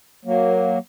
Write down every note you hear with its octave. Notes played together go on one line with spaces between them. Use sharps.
F#3 A#3